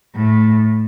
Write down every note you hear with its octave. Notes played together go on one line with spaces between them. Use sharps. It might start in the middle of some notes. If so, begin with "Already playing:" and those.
A2